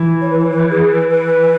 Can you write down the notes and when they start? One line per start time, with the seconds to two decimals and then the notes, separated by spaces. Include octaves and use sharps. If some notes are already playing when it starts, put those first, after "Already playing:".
Already playing: E3
0.21 C#5
0.30 B4
0.39 C#5
0.51 B4
0.70 G#4
0.91 B4
1.10 B4